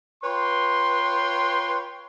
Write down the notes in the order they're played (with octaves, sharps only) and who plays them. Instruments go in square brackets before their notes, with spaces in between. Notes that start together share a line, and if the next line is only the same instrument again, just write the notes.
[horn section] F4 B4 C#5 G5 C6